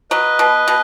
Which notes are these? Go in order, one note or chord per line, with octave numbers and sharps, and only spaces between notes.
F#3 B4 D#5
B2
B2